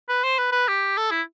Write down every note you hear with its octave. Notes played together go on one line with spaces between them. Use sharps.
B4
C5
B4
B4
G4
A4
E4